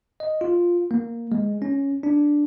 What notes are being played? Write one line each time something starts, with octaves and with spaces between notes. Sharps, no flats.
D#5
F4
A#3
G#3
C#4
D4